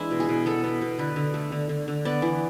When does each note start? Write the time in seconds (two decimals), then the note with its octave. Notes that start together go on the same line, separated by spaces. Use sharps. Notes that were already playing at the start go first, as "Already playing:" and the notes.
Already playing: E3 G#3 D4 E4
0.11 B2
0.20 G#4
0.29 B2
0.46 B3 A4
0.64 B3
0.82 B2
0.99 D3 B4
1.16 D3
1.34 A3
1.52 D3
1.69 D3
1.88 D3
2.05 B3 D5
2.22 E3